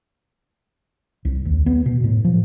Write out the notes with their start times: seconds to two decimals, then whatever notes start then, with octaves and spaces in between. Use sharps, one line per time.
1.25 C2
1.45 D#2
1.66 B3
1.86 B2
2.04 A2
2.25 F3